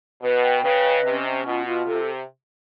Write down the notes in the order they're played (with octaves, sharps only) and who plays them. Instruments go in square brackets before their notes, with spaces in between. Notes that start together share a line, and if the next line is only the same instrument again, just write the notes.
[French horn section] B2 [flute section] B4
[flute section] G5
[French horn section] C#3 [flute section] B4
[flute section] D#5
[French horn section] C3 [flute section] C#4
[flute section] C#4
[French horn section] B2 [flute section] F4
[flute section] F4
[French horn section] C3 [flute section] A4